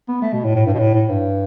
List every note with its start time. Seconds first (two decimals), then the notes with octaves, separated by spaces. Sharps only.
0.09 B3
0.22 A3
0.33 B2
0.45 A2
0.55 A2
0.66 G2
0.74 B2
0.80 A2
0.95 A2
1.09 G2